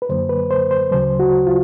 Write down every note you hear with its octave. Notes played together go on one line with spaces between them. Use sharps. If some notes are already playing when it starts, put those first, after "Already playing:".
B4
F#2 D3 F#3 A#3 C5
B4
C5
C5
D2 C#3 F#3 C5
F#4
F4